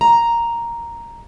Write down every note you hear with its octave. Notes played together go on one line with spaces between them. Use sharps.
A#5